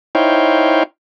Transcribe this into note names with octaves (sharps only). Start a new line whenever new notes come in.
D#4 E4 C5 C#5 F5 G5